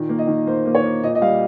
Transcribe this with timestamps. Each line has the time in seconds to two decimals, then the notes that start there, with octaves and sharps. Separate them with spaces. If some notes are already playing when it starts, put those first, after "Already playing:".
Already playing: A#2 D#3
0.09 A#3
0.19 D#5
0.28 D#3
0.47 A#3 C5
0.66 A#3
0.75 C#5
0.84 A#3
1.03 A#2 D#5
1.15 D#5
1.21 G3 F5